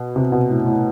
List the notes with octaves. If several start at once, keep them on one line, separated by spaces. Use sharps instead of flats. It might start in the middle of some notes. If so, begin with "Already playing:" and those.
Already playing: B2
C3
B2
A2
A2